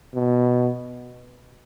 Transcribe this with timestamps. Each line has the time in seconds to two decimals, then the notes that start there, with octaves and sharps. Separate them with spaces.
0.14 B2